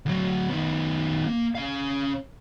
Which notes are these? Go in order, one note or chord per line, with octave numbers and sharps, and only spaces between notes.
D2 F#3
D#3 B3
A#3
C#4 F5